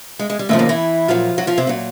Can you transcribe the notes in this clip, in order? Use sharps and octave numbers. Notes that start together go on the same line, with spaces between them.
G#3
G#3
G3
D#2 A2 C#3 F3 A3
A#2 A#3
E3 E4
A#2 F3 F#3 F4
F#3 F#4
F3 F4
C3 C4
A#2 F#3